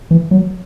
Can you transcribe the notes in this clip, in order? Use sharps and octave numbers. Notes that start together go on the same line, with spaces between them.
E3
F#3